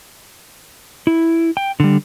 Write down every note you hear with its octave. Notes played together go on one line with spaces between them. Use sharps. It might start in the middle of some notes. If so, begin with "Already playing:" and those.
E4
G5
D3 G3